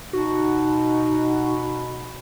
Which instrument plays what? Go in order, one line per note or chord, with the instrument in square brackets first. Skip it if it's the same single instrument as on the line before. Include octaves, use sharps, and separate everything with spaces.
[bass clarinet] B2 [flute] D#4 [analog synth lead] F#4